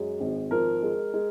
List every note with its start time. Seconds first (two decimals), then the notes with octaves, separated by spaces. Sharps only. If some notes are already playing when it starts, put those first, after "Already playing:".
Already playing: F#2 G#3
0.20 G#1
0.51 F3 A#4
0.83 G#3
1.13 G#3